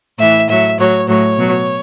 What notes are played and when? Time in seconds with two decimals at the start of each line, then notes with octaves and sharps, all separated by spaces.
0.18 A2 E3 E5
0.48 A2 F#3 E5
0.78 A2 F#3 C#5
1.07 A2 F#3 C#5
1.38 B2 F#3